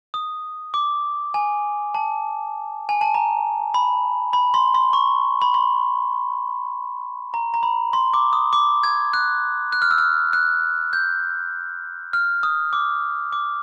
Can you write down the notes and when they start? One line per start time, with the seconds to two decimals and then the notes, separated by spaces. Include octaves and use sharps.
0.14 D#6
0.74 D6
1.34 G#5
1.95 A5
2.89 G#5
3.01 A5
3.14 A#5
3.74 B5
4.33 B5
4.54 C6
4.74 C6
4.93 C#6
5.42 B5
5.54 C6
7.34 A#5
7.54 A#5
7.63 B5
7.93 C6
8.14 D6
8.33 D#6
8.53 D6
8.83 G#6
9.13 F#6
9.72 F#6
9.82 F6
9.91 E6
9.98 F6
10.33 F#6
10.93 G6
12.13 F6
12.43 D#6
12.73 D6
13.33 D6